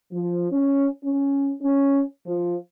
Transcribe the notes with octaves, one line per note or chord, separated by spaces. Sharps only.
F3
C#4
C#4
C#4
F3